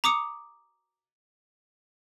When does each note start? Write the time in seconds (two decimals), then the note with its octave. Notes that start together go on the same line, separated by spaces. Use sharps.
0.04 A#5 D6 D#6 C#7